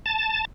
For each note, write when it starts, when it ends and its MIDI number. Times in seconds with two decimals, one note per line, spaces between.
0.06 0.45 81